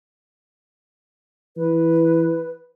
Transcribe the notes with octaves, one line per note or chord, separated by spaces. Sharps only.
E3 B4